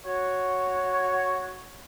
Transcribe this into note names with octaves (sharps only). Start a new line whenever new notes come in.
F#4 C#5